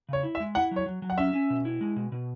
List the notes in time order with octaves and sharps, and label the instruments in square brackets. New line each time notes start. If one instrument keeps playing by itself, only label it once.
[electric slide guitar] C#3 [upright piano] C#5
[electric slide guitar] E4
[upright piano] E5
[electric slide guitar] G#3
[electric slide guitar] E4 [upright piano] F#5
[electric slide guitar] F#3 [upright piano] C#5
[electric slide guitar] F#3
F#3
[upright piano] F#5
[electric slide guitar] C#4 [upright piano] E5
[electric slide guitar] C#4
B2
E4
G#3
B2
B2